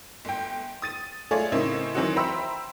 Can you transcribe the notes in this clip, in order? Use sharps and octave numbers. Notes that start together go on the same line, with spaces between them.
G1 G5
D#6 A6 D#7
A3 F4 G#4 A4 C#5 D5
A2 C#3 A#3 C4 D#4 E4
D#3 E3 F#3 C4 D#4 F#4
C5 E5 G5 A#5 B5 E6